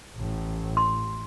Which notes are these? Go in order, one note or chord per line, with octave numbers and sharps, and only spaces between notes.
A1 A2
C6